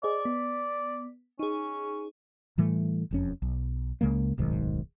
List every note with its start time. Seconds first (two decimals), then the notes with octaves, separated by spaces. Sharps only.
0.03 G#4 C5 D5 D#5
0.25 B3
1.39 C#4 D#4 G#4
2.58 A2 E3 G3 A3
3.11 E1 F2 C#4
3.42 B1
4.01 C#2 C#3 G#3 A#3
4.37 D1 B1 G#2 D#3